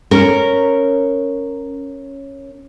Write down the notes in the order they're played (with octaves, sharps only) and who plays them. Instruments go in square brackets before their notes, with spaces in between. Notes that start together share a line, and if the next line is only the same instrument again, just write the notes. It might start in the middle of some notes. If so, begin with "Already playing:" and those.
[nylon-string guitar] C#4 A#4